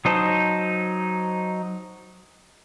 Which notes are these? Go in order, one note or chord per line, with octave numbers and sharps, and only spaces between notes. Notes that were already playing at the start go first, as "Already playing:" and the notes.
F#3 D#4 C5 A5